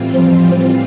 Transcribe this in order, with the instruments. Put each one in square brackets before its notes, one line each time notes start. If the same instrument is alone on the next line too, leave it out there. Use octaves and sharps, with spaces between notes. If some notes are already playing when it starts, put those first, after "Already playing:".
Already playing: [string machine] A2 E3 G3 C4 F4
[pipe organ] F3